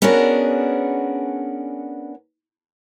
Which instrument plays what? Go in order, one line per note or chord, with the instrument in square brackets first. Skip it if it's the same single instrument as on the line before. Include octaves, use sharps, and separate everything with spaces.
[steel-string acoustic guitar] B3 C#4 D4 F#4 G#4 A#4